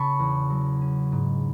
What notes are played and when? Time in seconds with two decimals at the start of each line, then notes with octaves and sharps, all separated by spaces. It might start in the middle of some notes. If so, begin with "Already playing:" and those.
Already playing: C#3 A5 B5 C#6
0.19 E2
0.50 F#3
0.81 C#4
1.12 G#2